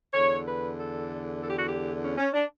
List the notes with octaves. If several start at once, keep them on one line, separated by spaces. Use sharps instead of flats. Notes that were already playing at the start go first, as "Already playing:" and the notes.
E2 D3 C#5
B4
A4
A4
G4
F#4
G4
C#4
C#4
D4